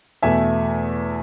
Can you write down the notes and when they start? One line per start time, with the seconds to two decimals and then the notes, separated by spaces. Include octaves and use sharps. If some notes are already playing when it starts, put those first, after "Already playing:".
0.23 E2 B2 A3 E5 G#5